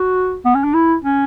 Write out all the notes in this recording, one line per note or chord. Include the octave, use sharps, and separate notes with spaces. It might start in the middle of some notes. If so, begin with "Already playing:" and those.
Already playing: F#4
B3
C#4
D4
E4
C#4